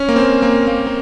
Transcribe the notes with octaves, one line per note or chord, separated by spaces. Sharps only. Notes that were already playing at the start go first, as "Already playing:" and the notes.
Already playing: C#4
A#3
C4
A#3
A#3
A#3